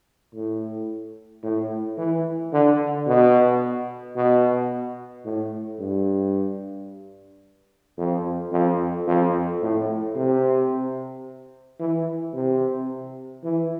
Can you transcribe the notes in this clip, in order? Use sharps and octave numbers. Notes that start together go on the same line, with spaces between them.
A2
A2
E3
D3
B2
B2
A2
G2
F2
F2
F2
A2
C3
E3
C3
E3